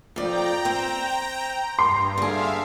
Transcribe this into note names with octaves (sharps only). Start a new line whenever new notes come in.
F2 D5 G5 A#5
C4
G2 C6
D3 G#4 E5 F5